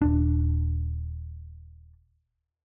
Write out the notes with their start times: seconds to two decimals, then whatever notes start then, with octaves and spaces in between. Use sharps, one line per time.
0.02 D#1 D4